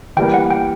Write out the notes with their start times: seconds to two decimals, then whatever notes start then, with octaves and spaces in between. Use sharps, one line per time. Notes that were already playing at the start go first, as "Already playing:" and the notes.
0.17 E3 G3 A#3 G5
0.34 F#5
0.51 G5